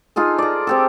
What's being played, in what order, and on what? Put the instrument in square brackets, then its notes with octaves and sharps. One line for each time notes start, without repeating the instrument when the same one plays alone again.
[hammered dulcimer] D#4 F4 G#4 A4
D5 A#5
C4 G4 A4